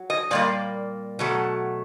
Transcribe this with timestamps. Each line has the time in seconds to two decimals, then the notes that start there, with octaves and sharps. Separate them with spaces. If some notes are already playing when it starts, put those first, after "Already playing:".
Already playing: F#3
0.10 D#5
0.31 A#2 G3 A#3 D5
1.19 B2 F#3 A3